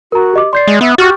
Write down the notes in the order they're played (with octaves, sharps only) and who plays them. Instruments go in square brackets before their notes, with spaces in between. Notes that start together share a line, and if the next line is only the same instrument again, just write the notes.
[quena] F#4 [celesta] A#4 A#5
[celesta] G4 D#5 D6
[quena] D5 [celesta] C6 G6 C7
[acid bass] G#3
[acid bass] B3 [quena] E5
[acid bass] F#4 [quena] G4 [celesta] C#6 F6 A6